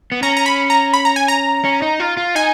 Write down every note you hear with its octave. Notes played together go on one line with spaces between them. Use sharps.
B3
C#4 A#5
A#5
B5
A#5
B5
A#5
G#5
A#5
C#4
D#4
F4
F4
D#4 G#5